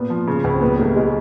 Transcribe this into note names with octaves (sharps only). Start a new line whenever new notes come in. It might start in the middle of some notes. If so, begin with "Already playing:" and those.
Already playing: A#2 B3
F3
C#3
C#2
C4
A#2 B3
B1 A3
G#3